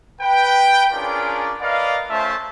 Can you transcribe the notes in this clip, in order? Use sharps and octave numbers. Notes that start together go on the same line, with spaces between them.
B4 G5
C#4 D4 F4 G#4 A#4 D5
A#4 B4 D5 D#5 F5
A3 C#4 F4 C5 E5 A5